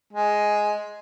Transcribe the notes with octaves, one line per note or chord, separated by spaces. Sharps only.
G#3